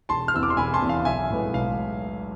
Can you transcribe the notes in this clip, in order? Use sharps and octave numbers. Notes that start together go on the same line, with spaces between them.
E1 A5 C6
F6
E2 C3 E3 E6
D6
C6
E1 G#5 B5
A5 C6
E2 C3 E3
F5
B1 E5 G#5
A2 G#3 B3
B1 F5